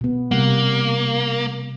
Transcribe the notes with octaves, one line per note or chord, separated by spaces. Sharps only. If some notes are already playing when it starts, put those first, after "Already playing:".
B2 B3
C3 G3 A#3 F#5